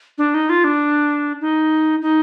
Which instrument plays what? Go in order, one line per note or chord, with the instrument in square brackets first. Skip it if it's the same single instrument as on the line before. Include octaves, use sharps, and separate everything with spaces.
[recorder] D4
D#4
F4
D4
D#4
D#4